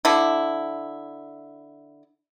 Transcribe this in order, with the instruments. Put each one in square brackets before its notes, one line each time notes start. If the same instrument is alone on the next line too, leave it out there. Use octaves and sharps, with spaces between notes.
[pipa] D3 E4